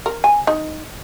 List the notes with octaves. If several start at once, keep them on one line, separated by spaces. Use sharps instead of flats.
A#4
G#5
D#4